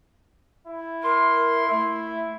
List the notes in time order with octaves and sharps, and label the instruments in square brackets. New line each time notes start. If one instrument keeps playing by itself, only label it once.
[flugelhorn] E4
[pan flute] A#4 [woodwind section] C6
[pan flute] A3 [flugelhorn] E4